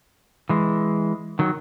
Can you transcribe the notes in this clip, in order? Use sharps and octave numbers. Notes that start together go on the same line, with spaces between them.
E3 G#3
D#3 F#3